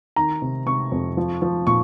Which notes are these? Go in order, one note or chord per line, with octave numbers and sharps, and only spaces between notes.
D#3 A#5
C3
C3 C#6
F2
F3
F3
A#2 C#6